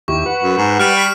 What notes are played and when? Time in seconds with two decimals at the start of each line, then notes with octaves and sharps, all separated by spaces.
0.08 D#2 E4 G4 C#6
0.26 B4 F#5
0.42 F#2
0.58 G#2
0.79 G3 F6 D7
0.97 B5 F6 B6